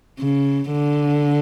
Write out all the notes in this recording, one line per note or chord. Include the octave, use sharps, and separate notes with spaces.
C#3
D3